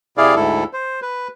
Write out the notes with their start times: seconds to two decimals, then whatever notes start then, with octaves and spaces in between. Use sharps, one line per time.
0.18 C3 E4 G#4 D5 F5
0.36 D2 G#2 E4 A4
0.73 C5
1.02 B4